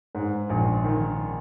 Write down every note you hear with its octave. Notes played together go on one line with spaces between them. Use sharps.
G#2
A#1
D#3